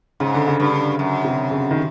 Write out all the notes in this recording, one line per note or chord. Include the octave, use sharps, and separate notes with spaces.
G#2 C#3
D3
C#3
G2
F#2
C3
C#3
D#3